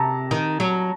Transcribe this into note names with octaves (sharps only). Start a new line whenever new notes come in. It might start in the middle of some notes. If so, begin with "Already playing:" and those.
Already playing: C3 A5 A#5
D#3
F#3